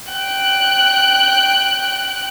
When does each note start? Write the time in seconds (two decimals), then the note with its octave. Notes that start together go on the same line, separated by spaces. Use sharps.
0.12 G5 F#6